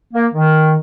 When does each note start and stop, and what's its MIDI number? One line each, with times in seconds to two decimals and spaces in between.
0.14 0.26 58
0.34 0.75 51